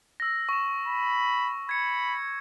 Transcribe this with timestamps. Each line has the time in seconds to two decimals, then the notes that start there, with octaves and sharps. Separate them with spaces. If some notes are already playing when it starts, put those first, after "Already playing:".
0.20 E6 A#6
0.49 C#6 E7
0.88 B5
1.69 B5 G#6 C#7